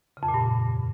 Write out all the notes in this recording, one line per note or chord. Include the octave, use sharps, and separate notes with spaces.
C#3
F2
A#2
G2